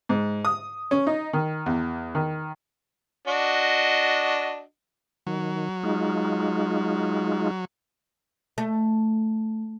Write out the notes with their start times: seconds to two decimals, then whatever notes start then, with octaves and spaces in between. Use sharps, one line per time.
0.09 G#2
0.45 D#6
0.91 C#4
1.07 D#4
1.33 D#3
1.66 E2
2.15 D#3
3.27 D4 F#4 D#5
5.27 D#3 F#3
5.83 G#3 D#4 F4
8.58 A3